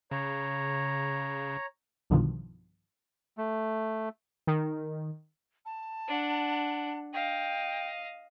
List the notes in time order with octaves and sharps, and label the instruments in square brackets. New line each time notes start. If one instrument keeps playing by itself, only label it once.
[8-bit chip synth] C#3 [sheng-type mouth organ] C#5 A#5
[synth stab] B1 G2 B2 D3 D#3 F3
[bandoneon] A3
[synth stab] D#3
[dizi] A5
[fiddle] D4 F#5
[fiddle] D#5 F5 [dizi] G5